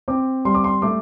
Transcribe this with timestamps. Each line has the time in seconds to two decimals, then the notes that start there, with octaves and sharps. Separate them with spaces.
0.08 C4 D6
0.45 G3 C6
0.55 D6
0.64 C6
0.82 A3 D6